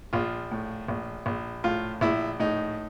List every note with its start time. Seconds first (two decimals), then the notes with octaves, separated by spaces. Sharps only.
0.13 A#1 F4
0.51 A2
0.88 A#1
1.26 A#1
1.64 A2 F4
2.01 A#1 E4
2.40 A2 D#4